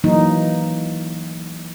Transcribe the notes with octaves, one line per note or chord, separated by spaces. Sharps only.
E3 F#3 A#3 D#4